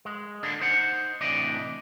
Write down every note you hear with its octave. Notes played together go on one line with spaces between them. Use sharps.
G#3
D3 A#3 D4
D#4 C5 F#5
A2 C3 E3 D4 D5 D#5